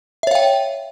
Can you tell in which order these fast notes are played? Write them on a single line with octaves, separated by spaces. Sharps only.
E5 C#5 F5 G5